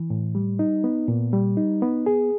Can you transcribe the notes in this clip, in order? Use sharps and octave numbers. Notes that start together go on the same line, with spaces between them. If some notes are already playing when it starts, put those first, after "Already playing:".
Already playing: E3
A2
G3
D#4
B3
A#2
G3
D#4
B3
G#4